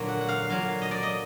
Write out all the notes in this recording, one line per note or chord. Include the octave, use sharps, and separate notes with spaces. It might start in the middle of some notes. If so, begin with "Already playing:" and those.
Already playing: A#2 D3 F#3
F#5
F#5
F5
A#2 F#3 F5
D#5
D5
D#5